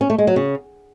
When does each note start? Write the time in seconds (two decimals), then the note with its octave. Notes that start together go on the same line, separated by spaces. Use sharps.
0.01 C#4
0.10 A3
0.18 G#3
0.27 F#3
0.36 C#3